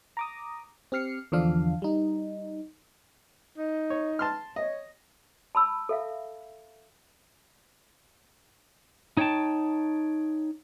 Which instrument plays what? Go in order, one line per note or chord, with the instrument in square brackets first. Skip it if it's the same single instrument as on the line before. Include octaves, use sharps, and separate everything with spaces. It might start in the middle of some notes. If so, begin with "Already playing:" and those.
[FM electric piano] A#5 D6 D#6
C4 G4 F6 C7 C#7
E2 D3 F3 D4 F5
G3 D#4
[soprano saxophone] D#4
[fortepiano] C#5
A5 C6 F6
[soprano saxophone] C#5 [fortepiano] D#5
[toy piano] A5 B5 E6
A4 E5 F5
[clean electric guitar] D#4 C#5 F#5 G5 A5